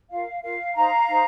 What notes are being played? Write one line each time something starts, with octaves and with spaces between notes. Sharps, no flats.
F4 A#4 F5
F4 A#4 F5
D#4 C5 F5 A#5
D#4 C5